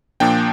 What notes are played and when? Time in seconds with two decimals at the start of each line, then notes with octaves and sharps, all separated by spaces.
0.20 A#2 F3 A#3 D4 G5